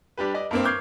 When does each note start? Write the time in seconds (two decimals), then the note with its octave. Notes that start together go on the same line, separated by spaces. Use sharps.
0.18 G3 D4 G4 B4
0.34 D5 D#5
0.51 G2 A#3 C4
0.63 C#6 D6 F6 G6 G#6 C7